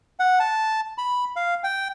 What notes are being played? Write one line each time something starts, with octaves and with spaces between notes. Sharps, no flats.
F#5
A5
B5
F5
G5